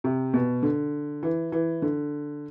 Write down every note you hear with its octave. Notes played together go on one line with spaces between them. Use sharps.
C3
B2
D3
E3
E3
D3